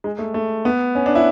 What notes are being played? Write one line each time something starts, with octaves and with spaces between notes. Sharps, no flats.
G#3
A3
A3
B3
C#4
D4
E4